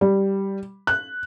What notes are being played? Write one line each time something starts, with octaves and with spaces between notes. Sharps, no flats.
G3
F#6